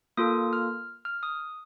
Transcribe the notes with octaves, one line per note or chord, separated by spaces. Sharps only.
A#3 F4 A4 D#6
F6
F6
D#6